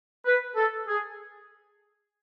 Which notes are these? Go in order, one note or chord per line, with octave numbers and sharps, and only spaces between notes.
B4
A4
G#4